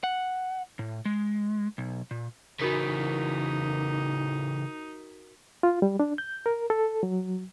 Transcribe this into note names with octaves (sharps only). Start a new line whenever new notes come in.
F#5
A2
G#3
B1
A#2
C#3 E3 D#4 F#4 A#4 B6
F4
G3
D4
G6
A#4
A4
F#3